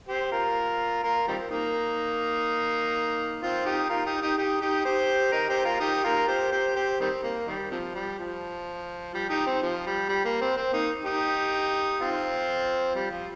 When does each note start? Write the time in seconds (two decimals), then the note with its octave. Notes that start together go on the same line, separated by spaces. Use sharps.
0.08 G4 C5
0.32 F4 A#4
1.04 F4 A#4
1.28 D#3 G3 C4
1.51 A#3 D#4
3.42 C4 F4
3.65 D#4 G4
3.89 F4 A#4
4.06 D#4 G4
4.21 D#4 G4
4.37 D#4 G4
4.61 D#4 G4
4.85 G4 C5
5.32 A#4 D#5
5.49 G4 C5
5.65 F4 A#4
5.80 D#4 G4
6.04 F4 A#4
6.27 G4 C5
6.51 G4 C5
6.75 G4 C5
7.00 D#3 G3 C4
7.23 A#3
7.47 D#3 G3
7.71 C3 F3
7.95 G3
8.19 F3
9.14 G3
9.29 D#4 G4
9.47 C4
9.62 F3
9.86 G3
10.09 G3
10.25 A#3
10.41 C4
10.57 C4
10.73 A#3 D#4
11.05 D#4 G4
12.00 C4 F4
12.95 G3
13.11 F3